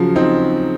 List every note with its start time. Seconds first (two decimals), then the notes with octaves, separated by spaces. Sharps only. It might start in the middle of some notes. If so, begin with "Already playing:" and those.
Already playing: C#3 F3 F#3
0.15 C4 D#4